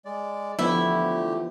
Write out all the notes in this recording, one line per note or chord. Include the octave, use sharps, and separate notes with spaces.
G#3 D5
D3 E3 F3 A3 B3 E4 G4